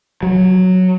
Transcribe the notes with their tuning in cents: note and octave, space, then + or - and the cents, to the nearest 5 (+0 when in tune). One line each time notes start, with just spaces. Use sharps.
F#3 -5